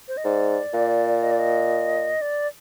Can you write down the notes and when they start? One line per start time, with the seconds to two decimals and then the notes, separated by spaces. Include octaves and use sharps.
0.08 C5
0.17 D#5
0.25 G#2 D5
0.74 A#2
1.23 D#5
1.31 D5
1.39 D#5
2.21 D5